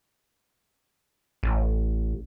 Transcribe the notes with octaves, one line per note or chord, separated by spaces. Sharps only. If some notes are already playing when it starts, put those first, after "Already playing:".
A1